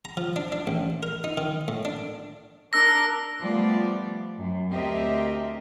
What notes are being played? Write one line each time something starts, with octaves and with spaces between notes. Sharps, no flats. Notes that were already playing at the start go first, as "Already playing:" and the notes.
A#5
F3
D4
D4
A1
A#4
D#4
D#3
A2
D4
D4 A#4 E6 A#6
F3 G3 A3 B3 D5
F#2
D2 C4 G4 A#4 D#5 E5